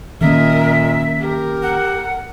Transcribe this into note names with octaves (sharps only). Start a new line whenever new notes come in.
A#2 D#3 A#3 C#4 A#4 D#5 E5
G4 A#4
F#5